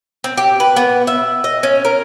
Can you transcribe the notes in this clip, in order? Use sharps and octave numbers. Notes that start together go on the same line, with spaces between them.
C4
G4
B4
B3
E5
D#5
C#4
A#4